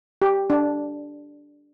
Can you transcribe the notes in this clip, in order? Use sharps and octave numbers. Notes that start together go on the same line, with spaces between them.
G4
D4